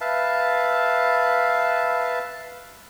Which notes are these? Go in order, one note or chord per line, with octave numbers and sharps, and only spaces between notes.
B4 E5 F5 A5